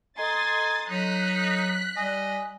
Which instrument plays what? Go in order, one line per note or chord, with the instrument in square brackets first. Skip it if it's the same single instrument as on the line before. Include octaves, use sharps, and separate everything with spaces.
[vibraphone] A4 D#5 A#5 [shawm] G#5 [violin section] C6 D#6 A6
[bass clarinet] F#3 [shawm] D#4 [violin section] F#6 B6
[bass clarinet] G3 [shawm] D#5 [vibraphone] G#5